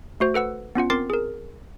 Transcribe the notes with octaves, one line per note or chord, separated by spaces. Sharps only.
A3 F#4 C5
A4 B4 F#5 E6
B3 C#4 F4 F#5
C4 A#4 C6 D6 A6 C7
G#4 A#4